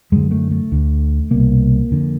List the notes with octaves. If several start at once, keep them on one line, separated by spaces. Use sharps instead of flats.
F#2 D3 G#3
A3
A3
D2 D3
C2 B2 A#3
F2 D3